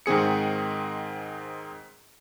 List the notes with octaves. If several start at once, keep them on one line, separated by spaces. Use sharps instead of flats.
G#2 D#3 C4 G#4 C#7